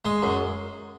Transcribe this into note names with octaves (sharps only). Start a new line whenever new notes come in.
G#3 C6
F#2